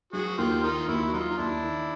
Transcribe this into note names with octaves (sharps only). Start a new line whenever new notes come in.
F#3 F#4 G#4
D#2 F4 G4
D#3 D#4 F4
D#2 E4 F#4
F#4
F#3 D#4 F4
D#4
D#2 D4 E4
D#3